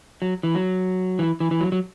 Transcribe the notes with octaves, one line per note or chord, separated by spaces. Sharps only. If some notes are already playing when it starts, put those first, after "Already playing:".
F#3
E3
F#3
E3
E3
E3
F#3
F#3